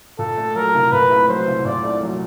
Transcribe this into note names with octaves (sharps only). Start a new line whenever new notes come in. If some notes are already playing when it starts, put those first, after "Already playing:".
A#2 A4
A3
F#3 A#4
C2
A#2 B4
A3
F#3 C5
C2
A#2 D5
A3
F#3